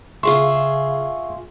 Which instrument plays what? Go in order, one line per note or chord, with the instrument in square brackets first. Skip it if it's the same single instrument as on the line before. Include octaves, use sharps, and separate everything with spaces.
[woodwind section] C#3 [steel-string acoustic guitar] F4 G#4 E5 [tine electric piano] C6 C#6